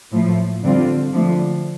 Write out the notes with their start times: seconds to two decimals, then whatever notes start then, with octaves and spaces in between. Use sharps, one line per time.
0.12 A2 F3 A3
0.63 F2 D3 G3 C4 F4
1.12 D3 F3 A3